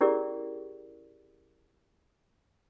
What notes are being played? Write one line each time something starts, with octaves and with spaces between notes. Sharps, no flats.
C#4 E4 G4 G#4 A#4 D5